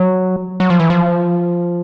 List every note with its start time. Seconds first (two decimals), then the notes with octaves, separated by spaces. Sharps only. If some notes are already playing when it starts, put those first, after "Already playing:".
Already playing: F#3
0.60 F#3
0.70 F3
0.80 E3
0.90 F3